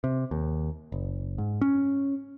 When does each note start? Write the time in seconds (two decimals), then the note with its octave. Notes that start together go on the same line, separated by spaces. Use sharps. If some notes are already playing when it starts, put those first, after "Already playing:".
0.04 C3
0.31 D#2
0.92 F#1
1.38 G#2
1.61 C#4